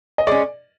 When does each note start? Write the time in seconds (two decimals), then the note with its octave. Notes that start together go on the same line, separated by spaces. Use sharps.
0.18 D#5
0.27 G#3 C#4 D5